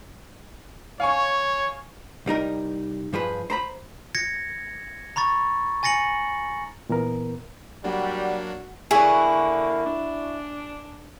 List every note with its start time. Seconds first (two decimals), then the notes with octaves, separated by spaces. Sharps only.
1.00 C#5 F5 G#5 C#6
2.26 C2 G3 D#4 A#4
3.13 G2 F3 G#4 B4
3.50 C5 A#5 B5
4.15 G#6 A#6 C#7
5.16 A#5 B5 C#6 A6
5.83 G#5 A6 A#6 C#7 F#7
6.89 A#2 E3 B3 A#4
7.84 F#3 G3 A#3 D4 F#4 F#5
8.91 D3 A#3 E4 F#4 G#4 D5
9.86 D4